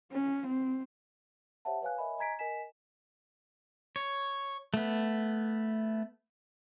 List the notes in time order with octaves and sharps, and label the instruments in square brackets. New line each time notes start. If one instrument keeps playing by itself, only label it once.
[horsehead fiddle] C#4
C4
[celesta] G4 C5 C#5 E5 F#5 A5
B4 C#5 F5 G#5 F#6
A#4 C#5 D#5 E5 G#5 B5
D#5 G#5 A#5 G#6 B6 D7
A#4 D#5 G#5 B6 E7
[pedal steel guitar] C#5
A3 B3